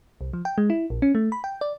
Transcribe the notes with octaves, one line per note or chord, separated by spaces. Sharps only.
C2
F3
G5
G#3
E4
A#1
C#4
A3
B5
G5
D5